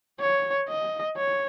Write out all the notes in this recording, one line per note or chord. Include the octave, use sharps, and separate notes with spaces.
C#5
D#5
C#5